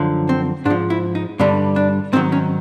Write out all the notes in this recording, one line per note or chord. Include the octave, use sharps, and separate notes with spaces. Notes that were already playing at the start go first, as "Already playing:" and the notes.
Already playing: F#2 D3 F3
C4
G#2 F3 D4
E4
D#4
G2 D3 G3 D4
D4
G#2 D#3 F#3 C4
C#4